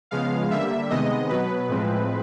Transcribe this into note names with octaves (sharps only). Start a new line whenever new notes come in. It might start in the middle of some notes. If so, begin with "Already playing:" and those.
C#3 F3 G#3 B3 F5
D3 G3 A#3 E5
C3 D#3 G#3 B3 D#5
B2 F#3 B3 B4
A2 F3 G#3 C4